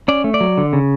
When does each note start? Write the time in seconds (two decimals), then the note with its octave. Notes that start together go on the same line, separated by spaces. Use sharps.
0.08 C#4 D5
0.24 A3
0.34 D5
0.41 F#3
0.58 D3
0.73 C#3